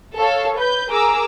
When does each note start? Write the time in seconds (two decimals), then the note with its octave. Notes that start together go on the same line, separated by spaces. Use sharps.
0.16 A4 C#5 F5
0.59 B4 G6
0.89 G#4 A#4 A#5 D6 E6